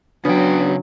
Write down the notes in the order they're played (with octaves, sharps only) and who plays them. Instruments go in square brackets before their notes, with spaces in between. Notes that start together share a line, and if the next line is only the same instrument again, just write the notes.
[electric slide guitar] C#3 G5 [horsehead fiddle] F#3 [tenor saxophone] B3 [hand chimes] D4